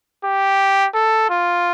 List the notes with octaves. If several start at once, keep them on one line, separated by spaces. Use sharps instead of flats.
G4
A4
F4